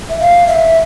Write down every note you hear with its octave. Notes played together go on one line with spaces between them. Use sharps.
E5
F5
E5